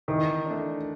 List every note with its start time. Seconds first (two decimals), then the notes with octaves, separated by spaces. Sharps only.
0.08 D#3 E3
0.45 A3 D4